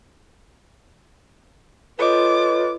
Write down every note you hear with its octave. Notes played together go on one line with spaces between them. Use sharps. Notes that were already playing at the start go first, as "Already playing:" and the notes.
F4 A4 B4 C#5 D#5 D6